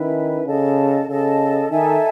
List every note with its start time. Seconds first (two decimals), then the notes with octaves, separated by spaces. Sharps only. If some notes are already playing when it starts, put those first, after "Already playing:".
Already playing: D#3 C#4 E4 B4 E5
0.46 C#3 A4 D#5 A5
1.08 C#3 A4 D#5 A5
1.70 D#3 D#4 A4 E5 G#5